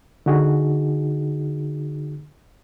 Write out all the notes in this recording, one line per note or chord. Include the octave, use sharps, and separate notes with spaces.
D3 D#4 F#4 G#4